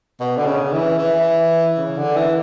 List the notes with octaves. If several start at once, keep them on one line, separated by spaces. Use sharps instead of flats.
B2
D3
C#3
E3
E3
C#3
D3
E3